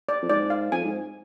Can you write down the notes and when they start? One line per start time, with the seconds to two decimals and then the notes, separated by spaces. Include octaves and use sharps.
0.09 D5
0.22 F2
0.30 G#2 D5
0.50 F5
0.72 F2 G#5
0.85 G#2